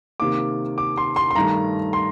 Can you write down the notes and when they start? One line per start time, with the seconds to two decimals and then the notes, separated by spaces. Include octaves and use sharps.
0.20 C3 D#3 A#3 D6
0.78 D6
0.97 C6
1.16 C6
1.31 C6
1.35 G2 D#3 A3 A#5
1.93 C6